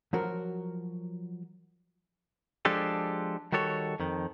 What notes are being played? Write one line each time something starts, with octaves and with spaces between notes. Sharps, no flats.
F3 F#3 F#4 A#4
F3 G#3 D4 G4 A4 A5
D#3 G3 F#4 A4 C#5
F2 D#3